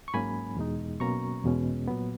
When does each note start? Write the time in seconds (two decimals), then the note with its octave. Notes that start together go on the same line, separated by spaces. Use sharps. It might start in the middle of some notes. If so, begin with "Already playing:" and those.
0.08 C#6
0.14 G#2 F#3 A#3 C#4 G#5 B5
0.57 E2 B2 G#3 D#4
1.00 B2 F#3 A#3 C#4 A#5 C#6
1.44 E2 B2 G#3 C#4
1.88 A#2 F#3 B3